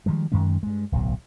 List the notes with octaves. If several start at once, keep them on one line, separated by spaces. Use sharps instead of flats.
D#3 F3 G3 G#3
F#2 D#3 G#3 C#4
G2 G#3
D1 B1 F#3